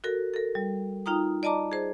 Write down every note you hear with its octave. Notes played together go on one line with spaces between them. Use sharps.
F#4 A4 A#4
A4 A#4
G3
D#4 F4 G5 A#5 D#6
D5 D#5 A5 A#5 D6
G#4 C5